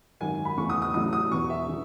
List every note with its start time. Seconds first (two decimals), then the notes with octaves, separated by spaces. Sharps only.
0.20 G#1 F#2 D#3 G#5
0.45 B5
0.57 E2 C#3 E3 A3 C#6
0.70 D#6
0.82 D#6
0.94 A1 A2 F#3 A3 D#6
1.13 D#6
1.31 E1 E2 B2 C#6
1.50 E5
1.69 E3